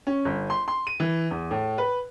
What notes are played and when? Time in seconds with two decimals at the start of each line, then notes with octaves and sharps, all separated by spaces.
0.07 C#4
0.25 G1
0.50 C6
0.68 C6
0.87 D#7
1.00 E3
1.31 E2
1.51 A2
1.78 B4